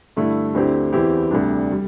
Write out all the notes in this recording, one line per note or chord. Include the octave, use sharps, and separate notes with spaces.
G2 D3 A3 E4
D2 D3 C4 E4 G4
E2 E3 C4 E4 G4
D2 C3 G3 D4
G3